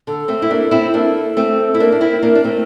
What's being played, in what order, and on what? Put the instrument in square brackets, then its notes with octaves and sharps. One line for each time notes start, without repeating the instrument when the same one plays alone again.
[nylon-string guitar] D3 [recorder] A4
[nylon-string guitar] A3 C4
E4
A#3 D4
C4 E4
A#3 D4
A3 C4
E4
[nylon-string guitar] A#3 D4 [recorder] A#4
[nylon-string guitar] D4
C4 E4
A#3 D4
D4
A3 C4